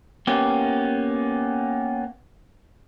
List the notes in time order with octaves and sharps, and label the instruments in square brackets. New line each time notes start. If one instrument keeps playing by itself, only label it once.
[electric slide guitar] A#3 B3 C#4 G4